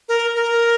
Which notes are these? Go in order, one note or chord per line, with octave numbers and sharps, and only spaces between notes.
A#4
A#4